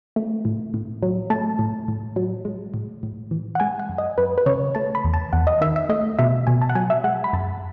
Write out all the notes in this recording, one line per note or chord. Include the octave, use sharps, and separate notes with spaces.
A3
A2
A2
F#3
A3 A5
A2
A2
F#3
G#3
A2
A2
E3
F#5
G#3 G#5
F#5
F#2
D#5
F#2 B4
B4
C#3 C#5
A3 A5
B5
E2
A5
E2 F#5
D#5
D#3 E5
E5
A3 D#5
B2 E5
B2 G#5
A5
F#5
F#3 G#5
E5
G#3 F#5
B5
F#2 A5